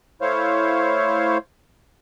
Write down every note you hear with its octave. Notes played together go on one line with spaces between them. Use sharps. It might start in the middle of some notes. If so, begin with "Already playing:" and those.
A3 E4 C5 C#5 F5